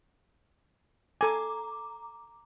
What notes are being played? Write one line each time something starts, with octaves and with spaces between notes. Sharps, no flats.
A4 G#5 A#5 D6